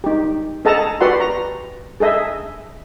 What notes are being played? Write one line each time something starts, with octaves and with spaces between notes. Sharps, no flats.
D#4 G4
G#4 A4 D#5 F#5 A5 A#5
F#4 G4 B4 D5 F#5 C6
A#5
G#4 A4 D#5 E5